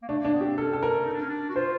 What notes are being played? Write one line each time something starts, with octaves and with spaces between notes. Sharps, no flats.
A#3
A3 D4
A#3 D4
B3
G4
C4
C#4 A4
A4
A#4
D#4
D4
C#4
D4
F#4
F4 C5